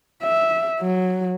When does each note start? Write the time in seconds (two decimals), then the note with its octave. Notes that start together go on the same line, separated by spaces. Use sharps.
0.23 E5
0.81 F#3